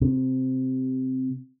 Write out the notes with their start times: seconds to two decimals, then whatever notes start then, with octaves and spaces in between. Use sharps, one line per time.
0.01 C3